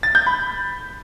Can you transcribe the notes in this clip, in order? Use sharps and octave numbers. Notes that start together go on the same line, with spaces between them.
A6
G6
B5